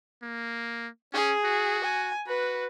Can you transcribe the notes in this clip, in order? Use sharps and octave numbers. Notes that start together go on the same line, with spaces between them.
A#3
C#4 G#4
F#4
G#5
F#4 B4